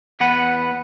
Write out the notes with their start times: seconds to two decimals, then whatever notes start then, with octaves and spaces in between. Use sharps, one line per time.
0.20 E2 B3 B4 F#5